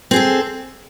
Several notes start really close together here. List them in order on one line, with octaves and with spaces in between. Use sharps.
C4 G#4 A4